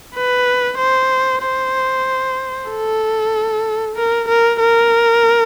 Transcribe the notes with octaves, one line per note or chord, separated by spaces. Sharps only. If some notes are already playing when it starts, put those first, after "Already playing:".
B4
C5
C5
A4
A#4
A#4
A#4